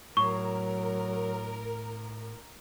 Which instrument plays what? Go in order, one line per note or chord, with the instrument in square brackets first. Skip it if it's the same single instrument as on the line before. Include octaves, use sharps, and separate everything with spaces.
[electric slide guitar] A2 [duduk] F#3 [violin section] A#4 [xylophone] C#6